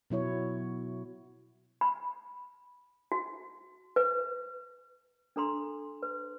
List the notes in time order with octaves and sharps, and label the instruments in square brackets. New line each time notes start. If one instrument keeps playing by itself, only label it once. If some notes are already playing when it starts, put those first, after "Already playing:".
[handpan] B2 F#3 E4 C#5
[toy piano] B5
F#4
B4
D4 A4 A#5 C6
B4